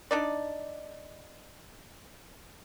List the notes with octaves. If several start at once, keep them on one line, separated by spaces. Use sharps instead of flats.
D4 D#4 D5